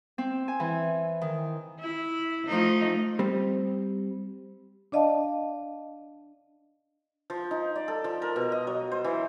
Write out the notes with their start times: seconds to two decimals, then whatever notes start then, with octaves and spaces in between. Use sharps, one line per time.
0.18 C4
0.48 G#5
0.60 E3
1.21 D#3
1.80 E4
2.46 F3 A3 D#4
3.19 G3 C4
4.92 D4 D5 D#5 F5 A5
7.30 F3
7.51 D#4
7.76 D5
7.88 A4
8.04 F3
8.22 A#4
8.36 B2
8.52 D#5
8.67 F#3
8.92 C5
9.04 E3